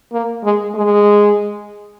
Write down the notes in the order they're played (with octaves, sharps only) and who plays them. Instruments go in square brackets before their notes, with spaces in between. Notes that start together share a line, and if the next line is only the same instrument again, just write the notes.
[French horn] A#3
G#3
G#3